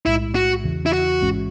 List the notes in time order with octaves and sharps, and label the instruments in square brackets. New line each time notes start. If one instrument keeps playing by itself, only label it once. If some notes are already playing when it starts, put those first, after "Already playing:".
[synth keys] B1 A2 G#3 [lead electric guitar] E4
[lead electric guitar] F#4
[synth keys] E2 C#3 E3
[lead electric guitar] E4
F#4
[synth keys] A1 G#2 E3 G#3 C#4